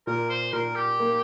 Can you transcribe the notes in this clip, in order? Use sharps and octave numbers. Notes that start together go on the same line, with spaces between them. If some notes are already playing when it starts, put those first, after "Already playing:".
A#2 A#4
C5
A#2 A#4
G4
A#3